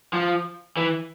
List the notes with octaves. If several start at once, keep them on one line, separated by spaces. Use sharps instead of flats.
F3
E3